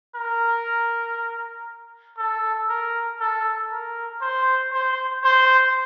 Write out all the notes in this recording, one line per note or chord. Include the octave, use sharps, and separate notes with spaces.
A#4
A4
A#4
A4
A#4
C5
C5
C5